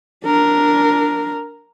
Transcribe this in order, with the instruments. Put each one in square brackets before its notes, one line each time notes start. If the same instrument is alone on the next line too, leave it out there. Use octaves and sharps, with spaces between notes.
[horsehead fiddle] D4 A#4